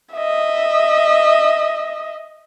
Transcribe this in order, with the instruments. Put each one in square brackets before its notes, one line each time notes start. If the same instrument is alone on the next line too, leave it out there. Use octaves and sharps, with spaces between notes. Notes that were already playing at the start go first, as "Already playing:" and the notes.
[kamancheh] D#5 E5